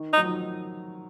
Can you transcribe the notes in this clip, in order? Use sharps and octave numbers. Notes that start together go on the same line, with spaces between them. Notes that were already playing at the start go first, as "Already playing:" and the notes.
Already playing: D#3
D#4
F#3
F3